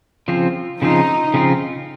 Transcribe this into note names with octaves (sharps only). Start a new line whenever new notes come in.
C#3 F3 C4 F4
C#3 F3 C4 D#4 F4
C#3 F3 C4 F4